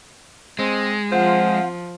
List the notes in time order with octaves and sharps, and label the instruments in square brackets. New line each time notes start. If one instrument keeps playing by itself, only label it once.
[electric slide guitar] G#3 [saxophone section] C4
[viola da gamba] F3 [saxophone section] C4 F4 C5 [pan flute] F#5